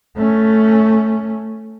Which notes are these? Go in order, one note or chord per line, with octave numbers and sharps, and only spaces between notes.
A3 C#4